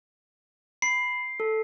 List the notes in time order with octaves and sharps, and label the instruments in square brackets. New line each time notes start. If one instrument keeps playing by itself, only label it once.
[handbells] B5 [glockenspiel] C7
[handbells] A4